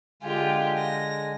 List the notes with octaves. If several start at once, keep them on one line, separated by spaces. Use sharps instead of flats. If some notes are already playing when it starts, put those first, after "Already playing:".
D3 G#3 F4 G4 G#5
A#6